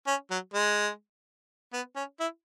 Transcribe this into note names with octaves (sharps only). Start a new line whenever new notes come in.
C#4
F#3
G#3
B3
C#4
E4